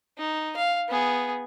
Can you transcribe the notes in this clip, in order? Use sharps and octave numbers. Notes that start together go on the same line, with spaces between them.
D#4
F5
B3 G#4